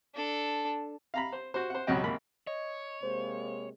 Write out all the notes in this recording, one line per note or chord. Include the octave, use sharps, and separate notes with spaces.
D4 A4
F5 A#5 B5
C5
F#4 C5
C5 F#5
C#2 B2 F#3 G4 D#5 G5
G#1 A#3 B5
C#5 D#5
C3 G#3 A#3 C5